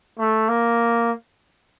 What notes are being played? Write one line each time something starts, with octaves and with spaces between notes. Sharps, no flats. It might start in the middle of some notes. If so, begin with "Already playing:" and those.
A3
A#3